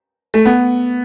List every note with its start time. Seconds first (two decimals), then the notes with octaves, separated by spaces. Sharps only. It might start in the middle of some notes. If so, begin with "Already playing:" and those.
0.34 A3
0.45 B3